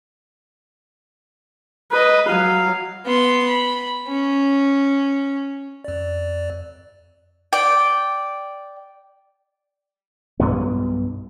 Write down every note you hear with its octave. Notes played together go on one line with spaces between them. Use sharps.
B4 D#5
F#3 F5
B3 C6
B5
C#4
F2 D5
D5 G5
B1 G2 B3